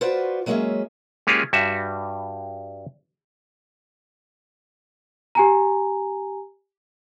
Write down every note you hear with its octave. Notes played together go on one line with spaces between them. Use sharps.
F4 F#4 B4 C5 D5
F#3 G#3 A#3 C#4 G#4 E5
G#3 A#3 C#4 F4 G4 G#4
G2 G3 F#4 E5
G4 G#5 A#5